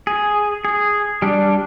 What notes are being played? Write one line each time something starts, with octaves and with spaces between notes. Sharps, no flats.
G#4
G#4
G3 D4